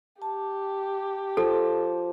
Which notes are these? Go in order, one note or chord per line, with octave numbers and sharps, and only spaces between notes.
G4 A5
F3 A4